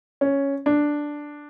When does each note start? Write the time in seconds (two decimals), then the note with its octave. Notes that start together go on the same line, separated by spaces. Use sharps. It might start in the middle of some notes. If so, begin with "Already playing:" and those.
0.21 C#4
0.66 D4